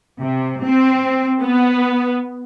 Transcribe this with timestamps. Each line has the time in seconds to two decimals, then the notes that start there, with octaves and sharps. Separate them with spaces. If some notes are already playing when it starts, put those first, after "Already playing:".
0.20 C3
0.64 C4
1.41 B3